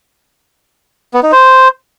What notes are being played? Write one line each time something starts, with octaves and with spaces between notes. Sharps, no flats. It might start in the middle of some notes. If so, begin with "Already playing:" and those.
B3
D#4
C5